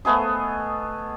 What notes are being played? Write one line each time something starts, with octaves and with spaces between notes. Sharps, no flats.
A3 B3 G#4 D#5